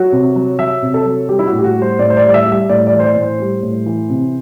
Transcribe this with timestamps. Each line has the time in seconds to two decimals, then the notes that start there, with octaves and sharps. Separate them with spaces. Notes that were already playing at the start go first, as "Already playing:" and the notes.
Already playing: F#3 F#4
0.12 C3
0.36 F#3
0.59 F#3 E5
0.82 C3
0.94 A4
1.06 F#3
1.29 G3 G4
1.39 E4
1.47 F#4
1.52 A2
1.59 G4
1.64 F#4
1.76 G3
1.82 C5
1.99 A2 D5
2.10 C5
2.17 D5
2.23 G3
2.29 D5
2.34 E5
2.46 G3
2.52 E5
2.69 A2 D5
2.87 D5
2.92 E3
2.99 C5
3.04 D5
3.16 A2
3.22 C5
3.40 G3
3.63 A2
3.86 E3
4.10 C3